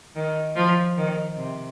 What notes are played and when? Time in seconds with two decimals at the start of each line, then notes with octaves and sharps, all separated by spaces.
0.16 D#3
0.56 F3
0.97 D#3
1.37 C3